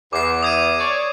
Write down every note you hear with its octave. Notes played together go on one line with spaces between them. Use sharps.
E2 D6 C7
D#6 G#6 D#7
C#5 D5